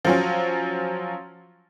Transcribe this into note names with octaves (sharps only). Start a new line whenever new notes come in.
F3 F#3 C#4